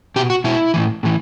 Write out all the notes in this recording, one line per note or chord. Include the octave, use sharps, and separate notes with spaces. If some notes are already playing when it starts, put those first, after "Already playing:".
B2 G4
F#4
B2 E4
A2 E3
A2 E3